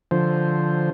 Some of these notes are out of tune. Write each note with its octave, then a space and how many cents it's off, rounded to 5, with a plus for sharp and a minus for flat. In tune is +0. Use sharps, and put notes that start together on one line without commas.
D3 +0 F3 +0 C5 +0